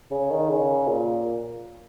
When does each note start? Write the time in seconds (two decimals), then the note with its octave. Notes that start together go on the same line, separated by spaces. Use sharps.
0.11 C#3
0.30 D#3
0.50 C#3
0.88 A#2